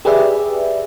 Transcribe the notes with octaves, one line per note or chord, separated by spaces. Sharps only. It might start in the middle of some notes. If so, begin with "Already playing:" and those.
G4 G#4 B4 D5 E5